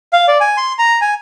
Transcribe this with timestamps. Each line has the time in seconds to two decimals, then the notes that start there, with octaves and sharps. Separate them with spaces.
0.13 F5
0.28 D5
0.41 G#5
0.57 C6
0.78 A#5
1.01 G#5